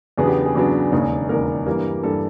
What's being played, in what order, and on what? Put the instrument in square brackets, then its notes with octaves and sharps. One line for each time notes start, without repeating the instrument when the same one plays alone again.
[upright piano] E2 C#3 F#3 B3 D4 G#4
G4
G#4
E2 C#3 F#3 B3 D4
E1 D#2 C#3
E1 D#2 C#3 A#4
G2 E3 G3 A#3
G2 E3 G3 A#3 A4